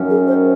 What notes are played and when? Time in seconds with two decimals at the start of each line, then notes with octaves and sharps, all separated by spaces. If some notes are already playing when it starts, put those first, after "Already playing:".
Already playing: F#2 D#3 F#3 C#4
0.09 G#4
0.27 C5